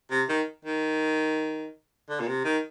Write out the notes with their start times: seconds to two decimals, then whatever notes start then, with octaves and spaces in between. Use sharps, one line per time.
0.10 C3
0.29 D#3
0.65 D#3
2.09 D3
2.20 A#2
2.27 C3
2.45 D#3